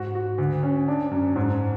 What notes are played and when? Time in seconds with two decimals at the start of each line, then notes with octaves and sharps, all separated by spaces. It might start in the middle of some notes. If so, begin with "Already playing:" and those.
Already playing: G#2 F#4
0.15 F#4
0.38 D2
0.63 C#4
0.88 D4
1.11 F#2
1.36 G#2